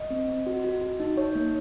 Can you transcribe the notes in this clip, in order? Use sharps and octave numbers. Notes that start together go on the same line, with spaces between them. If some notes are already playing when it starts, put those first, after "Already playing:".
Already playing: D#5
C4
C4
F#4
F#4
F#4
D#4
D#4 C#5
A#3